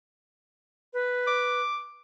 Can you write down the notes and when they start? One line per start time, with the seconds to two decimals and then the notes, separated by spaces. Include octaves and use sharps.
0.94 B4
1.27 D6